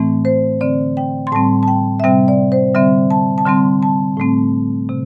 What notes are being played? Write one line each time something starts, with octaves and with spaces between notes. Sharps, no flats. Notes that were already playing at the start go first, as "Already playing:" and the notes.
Already playing: A2 E3 A3 C4
C5
D3 C4 D5
G5
C6
A2 G3 C4 A5
A5
G5
E5
C3 G3 C4 G5
D5
C5
D3 G3 C4 E5
A5
A5
D3 G3 C4 C6
A5
A2 A3 C4
C3